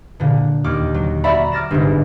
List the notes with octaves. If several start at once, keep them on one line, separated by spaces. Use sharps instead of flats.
A#2 D3
D#2 D6 F6
F#3
F#4 D5 E5 F#5 A#5 B5
D6 F6 A6 A#6 E7
G1 G#2